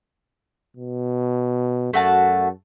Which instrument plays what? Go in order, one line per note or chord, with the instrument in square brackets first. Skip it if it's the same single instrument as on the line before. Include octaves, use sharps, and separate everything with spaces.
[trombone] B2
[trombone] F#2 [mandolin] A3 F#4 A5